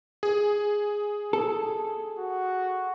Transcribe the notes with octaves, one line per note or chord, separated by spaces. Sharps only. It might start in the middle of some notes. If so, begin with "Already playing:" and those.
G#4
A4
F#4